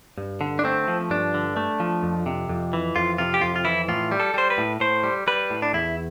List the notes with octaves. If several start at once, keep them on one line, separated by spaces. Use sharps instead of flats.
G2
D3
D4
A3 C4
F3
G2 D4
D3
A3
F3
F2
C3
F2
E3
F2 F4
C3 F4
G4
F2 F4
F4
E3 E4
A2 F4
G3
A4
G3 C5
B4
A2
A2 C5
G3
G3 B4
A2
D4
E2 E4